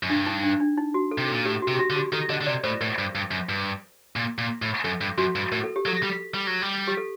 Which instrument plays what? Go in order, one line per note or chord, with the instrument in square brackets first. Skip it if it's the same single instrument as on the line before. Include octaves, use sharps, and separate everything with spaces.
[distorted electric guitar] F#2
[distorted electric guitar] G2 [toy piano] D4
[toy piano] D#4
D4
D4
D#4
F#4
A4
[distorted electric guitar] C3
[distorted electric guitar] A#2 [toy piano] A4
[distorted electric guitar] A2 [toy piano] G4
[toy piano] F#4
[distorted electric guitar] C3
[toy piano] G4
F#4
[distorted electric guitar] D3
[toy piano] G4
[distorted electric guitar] D#3 [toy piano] A4
[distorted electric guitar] D3 [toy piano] D#5
[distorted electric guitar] D3
[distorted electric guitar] C3 [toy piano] D5
[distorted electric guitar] A2 [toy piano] C5
[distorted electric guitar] A2 [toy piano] A#4
[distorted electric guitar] G2
G2
F#2
G2
A#2
A#2
A2
[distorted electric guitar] F#2 [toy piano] A4
[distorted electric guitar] G2
[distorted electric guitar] F#2 [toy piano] F#4
[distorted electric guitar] G2
[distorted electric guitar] A2 [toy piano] A#4
[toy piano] A4
G4
[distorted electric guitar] F#3 [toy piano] A4
[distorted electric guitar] G3
G3
F#3
G3
[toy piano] G4
A4